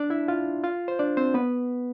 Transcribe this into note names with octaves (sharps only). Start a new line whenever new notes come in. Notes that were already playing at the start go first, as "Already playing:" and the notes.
Already playing: D4 D5
E4 E5
F4 F5
F4 F5
C5
D4 D5
C4 C5
B3 B4